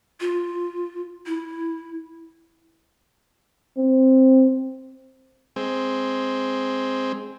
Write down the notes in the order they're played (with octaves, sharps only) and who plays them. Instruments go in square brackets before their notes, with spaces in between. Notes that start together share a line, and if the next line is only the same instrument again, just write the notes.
[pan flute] F4
E4
[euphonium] C4
[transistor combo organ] G#3 C4